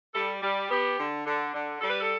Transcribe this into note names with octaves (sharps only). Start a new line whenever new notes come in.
G3 A4
G3
B3 G4
D3
D3
D3
G3 A4
B4
A4